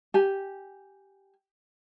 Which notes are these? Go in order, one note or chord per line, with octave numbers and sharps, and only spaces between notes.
G4 G#5